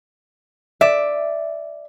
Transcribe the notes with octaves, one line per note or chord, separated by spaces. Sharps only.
D5 E5